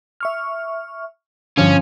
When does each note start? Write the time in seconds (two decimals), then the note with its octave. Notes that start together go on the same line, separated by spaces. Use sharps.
0.20 E5 C#6 F6
1.57 G2 D3 F3 C#4